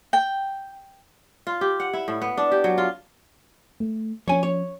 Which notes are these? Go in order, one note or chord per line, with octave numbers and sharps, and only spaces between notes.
G5
F4
G4
F#5
E4
A2
B3
D4
G4
F#3
F4
A3
F3 C#4 C#5 G#5
C#5